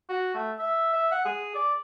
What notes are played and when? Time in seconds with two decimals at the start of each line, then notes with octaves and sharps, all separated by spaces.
0.09 F#4
0.34 A3
0.59 E5
0.93 E5
1.11 F#5
1.25 G#4
1.55 D5